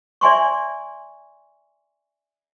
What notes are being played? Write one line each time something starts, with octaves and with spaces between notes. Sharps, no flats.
D5 E5 G#5 C6 C#6